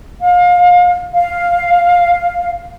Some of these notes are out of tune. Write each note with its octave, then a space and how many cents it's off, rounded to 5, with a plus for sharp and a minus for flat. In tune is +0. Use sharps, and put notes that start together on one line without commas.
F5 +30
F5 +0